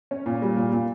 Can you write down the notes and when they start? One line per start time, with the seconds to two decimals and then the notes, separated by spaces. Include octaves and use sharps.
0.11 C#4
0.26 A#2
0.42 G3
0.57 A#2
0.73 A#2